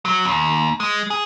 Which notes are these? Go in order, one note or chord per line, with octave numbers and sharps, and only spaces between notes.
F#3
D#2
G#3
G#4